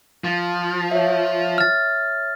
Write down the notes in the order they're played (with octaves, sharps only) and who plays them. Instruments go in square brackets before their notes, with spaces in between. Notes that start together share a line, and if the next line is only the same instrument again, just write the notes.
[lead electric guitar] F3
[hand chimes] C#5 E5
[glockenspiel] F6 A6